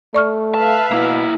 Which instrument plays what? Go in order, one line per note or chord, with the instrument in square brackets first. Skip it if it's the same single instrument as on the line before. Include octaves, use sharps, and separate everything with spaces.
[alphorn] A3 [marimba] D5 C#6 F6
[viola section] B4 E5 F5 [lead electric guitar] A5
[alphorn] B2 [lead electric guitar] A#3 E4